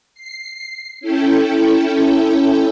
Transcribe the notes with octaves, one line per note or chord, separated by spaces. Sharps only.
C7
C#4 E4 A4 G5